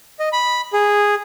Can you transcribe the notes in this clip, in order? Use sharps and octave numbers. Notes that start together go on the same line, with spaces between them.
D#5
B5
G#4